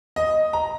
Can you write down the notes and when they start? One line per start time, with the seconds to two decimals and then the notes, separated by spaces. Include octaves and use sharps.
0.16 D#5
0.53 A#5